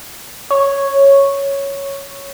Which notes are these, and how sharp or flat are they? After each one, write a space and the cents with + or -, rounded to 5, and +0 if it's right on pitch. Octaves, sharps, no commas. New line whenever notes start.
C#5 +0